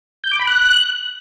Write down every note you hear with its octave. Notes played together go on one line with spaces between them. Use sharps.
G6
D6
B5
F#6